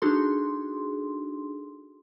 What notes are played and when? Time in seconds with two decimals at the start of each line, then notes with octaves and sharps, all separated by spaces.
0.02 D4 D#4 F#4 G#4 A4 C6